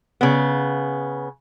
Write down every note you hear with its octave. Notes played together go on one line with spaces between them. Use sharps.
C#3 B3